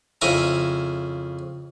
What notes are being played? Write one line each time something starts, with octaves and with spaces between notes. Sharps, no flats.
F2 C#3 E4 G#5 A#5